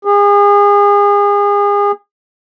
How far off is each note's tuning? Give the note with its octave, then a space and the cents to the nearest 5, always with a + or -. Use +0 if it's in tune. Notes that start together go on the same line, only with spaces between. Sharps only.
G#4 -35